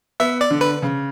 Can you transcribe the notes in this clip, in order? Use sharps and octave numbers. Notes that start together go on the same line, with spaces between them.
B3 E5
D5
D3
B4
C#3